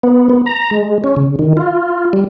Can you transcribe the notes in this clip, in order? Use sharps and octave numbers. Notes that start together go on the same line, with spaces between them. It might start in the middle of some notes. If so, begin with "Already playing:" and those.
B3
B3
A#5
G#3
C#4
C#3
D#3
F4
G3